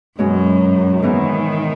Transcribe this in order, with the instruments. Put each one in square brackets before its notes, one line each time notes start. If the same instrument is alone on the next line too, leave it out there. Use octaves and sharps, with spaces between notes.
[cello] F#2 [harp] B2 G#3 C#4
[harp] G#2 E3 B3 [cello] D#3